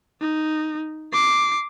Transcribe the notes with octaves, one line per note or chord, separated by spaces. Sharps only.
D#4
D6 C7